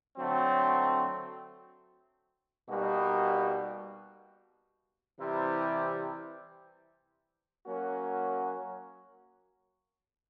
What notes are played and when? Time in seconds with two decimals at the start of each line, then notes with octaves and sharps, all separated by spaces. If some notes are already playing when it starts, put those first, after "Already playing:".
0.17 D3 F#3 A3 C4
2.68 B2 G3 A#3 D#4 F#4
5.17 C3 E3 G3 C4 E4
7.66 F#3 A#3 C#4 F#4